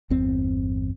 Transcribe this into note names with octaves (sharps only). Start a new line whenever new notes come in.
G1 E2 C4